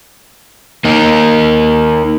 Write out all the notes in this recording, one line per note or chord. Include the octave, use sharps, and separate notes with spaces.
A#3 D#4